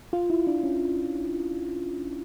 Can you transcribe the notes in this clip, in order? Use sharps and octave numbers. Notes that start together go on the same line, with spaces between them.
F4
E4
D4
C#4